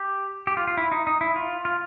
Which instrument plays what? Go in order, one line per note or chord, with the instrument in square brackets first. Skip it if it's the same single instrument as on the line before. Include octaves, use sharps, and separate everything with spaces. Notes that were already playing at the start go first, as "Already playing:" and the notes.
Already playing: [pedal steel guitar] G4
G4
F4
F4
E4
D#4
D#4
E4
F4
F4